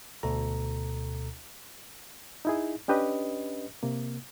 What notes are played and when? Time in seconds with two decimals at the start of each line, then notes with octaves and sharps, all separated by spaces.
0.23 D2 B2 A4 A#5
2.45 D#4 E4 G#4
2.88 C#4 D4 G4 B4 D#5
3.83 C3 A#3